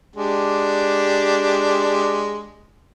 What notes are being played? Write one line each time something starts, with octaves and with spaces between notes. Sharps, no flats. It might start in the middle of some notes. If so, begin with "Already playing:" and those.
G#3 D4 G4